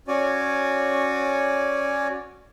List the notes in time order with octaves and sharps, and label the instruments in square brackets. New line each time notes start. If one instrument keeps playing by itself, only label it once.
[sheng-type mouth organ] C#4 F#4 C#5 D5 G#5